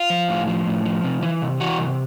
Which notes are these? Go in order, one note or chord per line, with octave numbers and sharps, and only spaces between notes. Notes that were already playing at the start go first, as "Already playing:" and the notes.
Already playing: F4
F3
A2
F3
A2
F3
C3
E3
C3
E3 F#4
C3